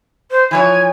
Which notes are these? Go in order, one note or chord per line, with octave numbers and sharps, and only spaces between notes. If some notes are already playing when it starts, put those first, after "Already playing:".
C5
E3 F3 C#5 G#5